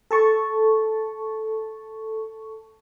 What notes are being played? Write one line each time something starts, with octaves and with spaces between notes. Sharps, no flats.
A4 A5 C#6